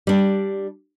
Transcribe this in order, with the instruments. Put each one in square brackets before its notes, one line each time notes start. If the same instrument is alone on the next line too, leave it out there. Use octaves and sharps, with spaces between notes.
[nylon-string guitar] G3 D4